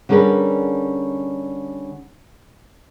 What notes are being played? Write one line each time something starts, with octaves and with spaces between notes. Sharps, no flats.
D3 G3 C#4 G#4 A#4 B4